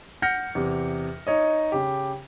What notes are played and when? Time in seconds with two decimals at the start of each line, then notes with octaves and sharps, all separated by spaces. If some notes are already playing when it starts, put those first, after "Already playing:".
0.22 F#5 F6 G6 A#6 C#7
0.55 E2 C3
1.27 D#4 C#5 D#5
1.72 C#3 G4